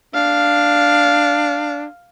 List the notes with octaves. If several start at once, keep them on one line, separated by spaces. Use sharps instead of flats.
D4 F5